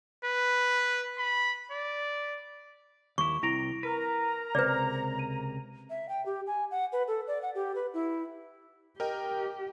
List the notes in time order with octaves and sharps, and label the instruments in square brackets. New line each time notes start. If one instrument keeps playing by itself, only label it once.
[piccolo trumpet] B4
B5
D5
[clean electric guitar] D#2 E4 [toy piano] C#6 [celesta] D6
[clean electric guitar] C2 C4 A#5 [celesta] E4 A#6 D7
[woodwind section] A#4 A#5 [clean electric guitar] B4
[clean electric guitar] C#2 C3 [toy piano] B4 D5 [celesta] C5 D6
[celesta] D#7
[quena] E5
G5
G4
G#5
F#5
B4
A4
D5
F#5
G4
B4
E4
[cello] G4 [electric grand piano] A#4 D#5 G5